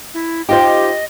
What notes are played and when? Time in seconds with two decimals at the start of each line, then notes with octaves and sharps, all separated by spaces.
0.14 E4
0.49 D#4 F4 G4 C5 D#5